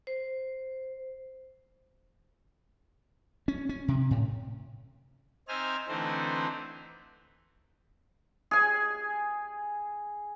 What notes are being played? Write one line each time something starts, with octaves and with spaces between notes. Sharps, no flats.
C5
C#4
C#4
C3
A2
C4 D#4 C5 E5 G#5 F6
D3 E3 A3 C4 D#4 C5
G#4 G#5